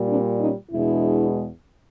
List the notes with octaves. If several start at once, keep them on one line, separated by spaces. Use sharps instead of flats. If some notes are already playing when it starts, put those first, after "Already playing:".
Already playing: A#2 G3
C4 D4
C#4 D#4
E2 B2 G#3 D4 E4